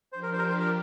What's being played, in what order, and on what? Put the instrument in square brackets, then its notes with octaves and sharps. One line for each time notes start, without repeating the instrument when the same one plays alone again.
[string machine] F3 D4 G4 [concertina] C5
[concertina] A#4
C5
A#4
C5
A#4